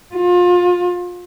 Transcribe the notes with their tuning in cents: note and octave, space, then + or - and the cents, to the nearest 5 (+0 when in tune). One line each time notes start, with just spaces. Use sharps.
F4 +30